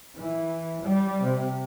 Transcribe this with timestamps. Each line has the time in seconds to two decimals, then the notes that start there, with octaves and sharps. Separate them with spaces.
0.17 E3
0.83 G3
1.24 C3